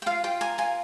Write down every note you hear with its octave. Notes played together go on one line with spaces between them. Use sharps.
G5
F4 F5
F4 G5
A#4 G#5
F4 G#5